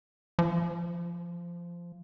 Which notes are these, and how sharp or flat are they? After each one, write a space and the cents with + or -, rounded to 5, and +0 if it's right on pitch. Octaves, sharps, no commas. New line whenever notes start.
F3 -15